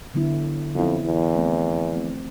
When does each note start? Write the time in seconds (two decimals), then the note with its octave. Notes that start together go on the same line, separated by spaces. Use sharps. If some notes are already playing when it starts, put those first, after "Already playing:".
0.14 D3 F#3 B3 E4
0.75 F2 D3 F#3 B3 E4
1.05 E2
1.35 F3 A3 C4
1.96 F3 A3 C4